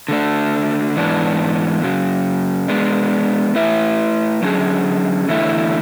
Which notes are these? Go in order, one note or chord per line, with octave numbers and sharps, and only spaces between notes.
D3 A3 D4
G#2 E3 B3 D4
F#2 C#3 F#3
G#3 B3 D4
A3 E4 B4 E5
D3 F#3 C#4 G#4
E2 D3 A3 E4